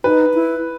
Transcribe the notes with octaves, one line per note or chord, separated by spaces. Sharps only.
D#4 B4
E4